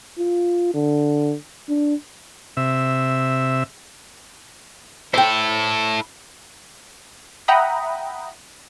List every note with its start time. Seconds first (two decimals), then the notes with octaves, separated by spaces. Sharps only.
0.19 F4
0.74 D3
1.69 D4
2.57 C3 E5
5.14 E4 A4 C5 G5
7.48 E5 F#5 G5 A#5 B5 D#6